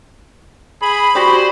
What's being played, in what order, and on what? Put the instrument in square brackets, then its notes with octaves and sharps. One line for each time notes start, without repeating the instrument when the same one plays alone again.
[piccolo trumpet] G#4 [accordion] B5
[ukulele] F#4 G4 D5 [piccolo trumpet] C5